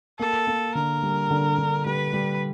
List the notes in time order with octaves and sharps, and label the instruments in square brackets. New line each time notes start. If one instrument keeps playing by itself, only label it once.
[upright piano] A#3 [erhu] A4
[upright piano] A#3
[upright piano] D3 [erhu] A#4
[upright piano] G3
D3
D3
[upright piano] G3 [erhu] B4
[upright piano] G3